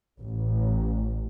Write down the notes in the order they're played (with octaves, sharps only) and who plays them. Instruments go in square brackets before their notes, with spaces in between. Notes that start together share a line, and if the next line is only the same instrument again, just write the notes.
[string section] A1